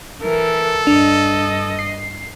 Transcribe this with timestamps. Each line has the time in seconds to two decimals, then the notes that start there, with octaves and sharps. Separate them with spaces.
0.21 E3 A4 A#4
0.87 G2 D4 D#5
1.79 C7